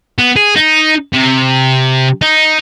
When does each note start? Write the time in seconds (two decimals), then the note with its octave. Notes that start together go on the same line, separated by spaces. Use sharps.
0.19 B3
0.36 G#4
0.56 D#4
1.13 C3
2.22 D#4